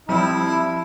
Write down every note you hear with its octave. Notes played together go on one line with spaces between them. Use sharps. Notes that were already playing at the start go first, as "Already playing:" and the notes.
F3 G3 C4 E4